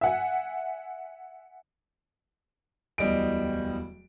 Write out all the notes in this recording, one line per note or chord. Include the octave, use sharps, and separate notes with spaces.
E5 F#5 G#5
D1 E2 G3 D#5 D7